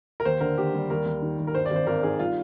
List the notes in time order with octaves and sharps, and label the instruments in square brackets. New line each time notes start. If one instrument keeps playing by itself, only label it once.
[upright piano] A#4
D#2 C5
D3 A#4
D#2 G4
G3
D#2 A#4
D#2
D#3
D#2
A#4
G2 C5
D5
G#1
C5
G#1 A#4
D#3 G#4
G3 F4